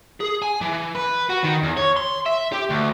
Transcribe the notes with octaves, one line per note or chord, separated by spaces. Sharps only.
G#4
G#5
E3
B4
F#4
D#3
E2
C#5
C6
E5
G4
D2